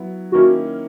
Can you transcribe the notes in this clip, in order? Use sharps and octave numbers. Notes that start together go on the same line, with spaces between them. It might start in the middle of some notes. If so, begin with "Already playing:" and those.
Already playing: F#3 B3 E4
D#3 A#3 C#4 E4 F#4